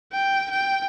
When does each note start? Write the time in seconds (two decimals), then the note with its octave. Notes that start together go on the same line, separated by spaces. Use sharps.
0.13 G5
0.50 G5